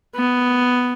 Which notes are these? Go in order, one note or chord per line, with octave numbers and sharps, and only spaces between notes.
B3